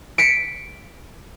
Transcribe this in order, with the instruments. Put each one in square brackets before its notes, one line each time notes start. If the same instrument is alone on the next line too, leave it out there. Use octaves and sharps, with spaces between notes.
[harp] B6 C#7 D7